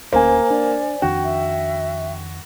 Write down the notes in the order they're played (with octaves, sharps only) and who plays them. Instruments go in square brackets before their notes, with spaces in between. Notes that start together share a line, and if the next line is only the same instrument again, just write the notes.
[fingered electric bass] D1 D2 C#4 [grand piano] A#3 [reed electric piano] C5 G#5 [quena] A#5
[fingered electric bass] D4 [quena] D5
[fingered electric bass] F2 D#3 D4 [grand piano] F#4 [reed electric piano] G5
[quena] E5